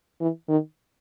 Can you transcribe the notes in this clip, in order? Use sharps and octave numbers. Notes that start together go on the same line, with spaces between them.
E3
D#3